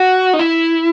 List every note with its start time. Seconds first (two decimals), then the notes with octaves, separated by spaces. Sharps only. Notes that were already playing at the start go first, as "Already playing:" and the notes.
Already playing: F#4
0.33 D#4
0.39 E4